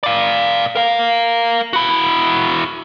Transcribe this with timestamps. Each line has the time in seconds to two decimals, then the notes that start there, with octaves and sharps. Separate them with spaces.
0.03 D5 F5
0.76 A#4 F5
1.73 E4 F#4